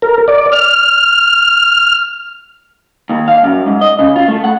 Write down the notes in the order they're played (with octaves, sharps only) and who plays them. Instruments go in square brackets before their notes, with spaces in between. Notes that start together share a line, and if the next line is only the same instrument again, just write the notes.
[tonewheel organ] A#4
D5
F6
[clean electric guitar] D#2
F5
F#2
G#2
D#5
C#3
F4
A3
F#5